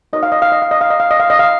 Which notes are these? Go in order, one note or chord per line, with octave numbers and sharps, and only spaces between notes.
D#4 F#4 A#4 C#5 D#5
F5
D#5
F5
D#5
F5
D#5
F5
D#5
F5
D#5
F5
D#5
F5